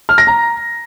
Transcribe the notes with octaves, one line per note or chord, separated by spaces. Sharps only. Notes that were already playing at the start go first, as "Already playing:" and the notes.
F6
A#6
A#5